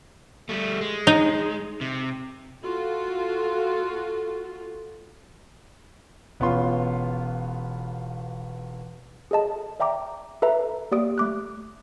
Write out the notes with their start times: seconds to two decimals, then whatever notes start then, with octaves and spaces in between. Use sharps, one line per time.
0.49 G3 A3
0.81 G#3
1.07 D#4
1.81 C3
2.63 F4 F#4 A4
6.40 E1 B3 C#4 F4 C6
9.31 G#4 A4 D#5 A5
9.80 D5 E5 G5 A#5 D6
10.42 A4 B4 E5 A#5
10.91 A#3 G4 D5 D#6 D7
11.18 A3 D6 F#6